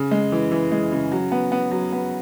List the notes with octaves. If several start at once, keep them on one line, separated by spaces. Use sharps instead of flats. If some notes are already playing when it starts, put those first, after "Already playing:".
Already playing: C#3
G#3
E3
E3
G#3
C#3
F#3
B3
B3
F#3
B3